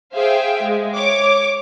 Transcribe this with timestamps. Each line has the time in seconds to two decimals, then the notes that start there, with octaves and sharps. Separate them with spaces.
0.13 G#4 C5 E5 F5 G5
0.62 G#3
0.95 C#5 D6